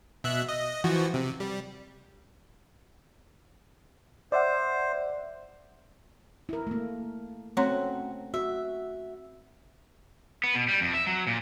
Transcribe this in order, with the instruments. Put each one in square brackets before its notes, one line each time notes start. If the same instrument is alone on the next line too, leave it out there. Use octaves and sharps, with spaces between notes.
[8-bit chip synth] B2 E5 F#6
D#5
E3 F3 F#4
C3
G3
[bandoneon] C5 [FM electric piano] D5 E5 F#5
[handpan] E4 A#4
A3 A#3
[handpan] A3 C4 C#4 [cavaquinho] F#4 [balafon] C#5 A#5 C6
[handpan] F#4 [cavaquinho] E5
[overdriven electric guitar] B3
B2
G3
F2
E5
F#3
A#2